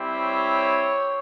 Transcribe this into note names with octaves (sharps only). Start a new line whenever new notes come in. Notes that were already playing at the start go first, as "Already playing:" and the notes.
Already playing: G3 C4 E4
C#5